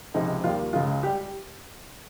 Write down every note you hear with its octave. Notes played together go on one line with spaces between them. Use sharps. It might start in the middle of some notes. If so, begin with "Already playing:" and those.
C#2 C3 F3 G#3 D#4
D#2 D#3 G3 F4
C#2 C#3 G#3 F4
G3 G4